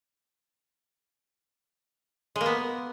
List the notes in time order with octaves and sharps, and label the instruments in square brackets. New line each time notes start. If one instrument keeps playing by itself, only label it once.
[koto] G#3
A#3
B3